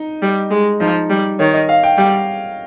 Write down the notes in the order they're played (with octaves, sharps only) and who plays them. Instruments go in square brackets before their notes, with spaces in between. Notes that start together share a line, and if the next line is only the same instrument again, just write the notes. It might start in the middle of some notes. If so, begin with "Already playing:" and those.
Already playing: [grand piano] D#4
[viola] G3
G#3
[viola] F3 [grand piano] D#4
[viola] G3
[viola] D#3 [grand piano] C#5
[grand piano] D#5
F5
G5
[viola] G3 [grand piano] G5